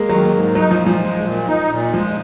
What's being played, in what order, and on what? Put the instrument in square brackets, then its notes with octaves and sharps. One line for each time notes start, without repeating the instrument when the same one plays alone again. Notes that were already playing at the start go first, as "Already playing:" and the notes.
Already playing: [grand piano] G#3 A#3
[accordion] D#3 [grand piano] F#3
[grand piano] A#3
[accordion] G#2
[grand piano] G#3
[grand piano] F#3 [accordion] D#4
[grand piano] F3
[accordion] A#2
[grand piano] F3
[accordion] G#3
A#2
D#4
A#2
[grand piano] F3 [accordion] G#3